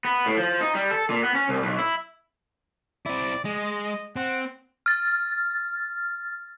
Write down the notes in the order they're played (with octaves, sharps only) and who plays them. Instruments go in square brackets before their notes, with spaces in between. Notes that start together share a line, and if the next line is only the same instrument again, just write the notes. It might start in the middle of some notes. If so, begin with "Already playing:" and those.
[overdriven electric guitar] B3
A2
F3
D#4
G3
A4
A#2
B3
C#4
C2
B1
E4
[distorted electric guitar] C4 E4 [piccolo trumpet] D5
[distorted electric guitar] G#3 [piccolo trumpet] D#5
[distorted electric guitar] C4 [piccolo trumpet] F#5
[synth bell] F6 A6